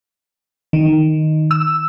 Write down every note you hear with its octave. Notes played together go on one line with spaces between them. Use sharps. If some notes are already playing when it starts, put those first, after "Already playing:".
D#3
E6